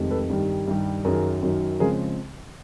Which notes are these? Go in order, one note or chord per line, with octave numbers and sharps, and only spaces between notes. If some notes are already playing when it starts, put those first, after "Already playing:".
Already playing: F1 F2 C3 D#3 G#3
A4 B4
G2 D#3 G3
G2 D#3 G3
F#2 D#3 F#3 G#4 A#4
F#2 D#3 F#3
C#3 F3 G#3 C4 G#4 A#4